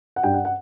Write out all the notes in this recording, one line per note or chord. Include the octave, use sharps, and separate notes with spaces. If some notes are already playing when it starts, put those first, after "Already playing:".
F#5
G2 G5
F#5
F#5